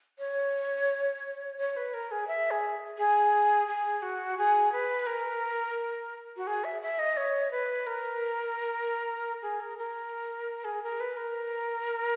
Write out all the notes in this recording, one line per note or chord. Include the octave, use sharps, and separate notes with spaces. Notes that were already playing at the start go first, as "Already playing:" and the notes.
C#5
C#5
B4
A#4
G#4
E5
G#4
G#4
G#4
F#4
G#4
B4
A#4
F#4
G#4
E5
E5
D#5
C#5
B4
A#4
G#4
A#4
A#4
G#4
A#4
B4
A#4